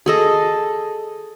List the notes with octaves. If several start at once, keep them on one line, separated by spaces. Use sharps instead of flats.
G#4 A4 D#5